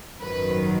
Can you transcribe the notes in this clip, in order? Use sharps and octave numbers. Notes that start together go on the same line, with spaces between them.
G#1 F#2 D#3 F#3 B4